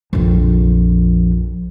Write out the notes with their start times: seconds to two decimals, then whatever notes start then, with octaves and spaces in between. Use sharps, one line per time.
0.13 A#1 F2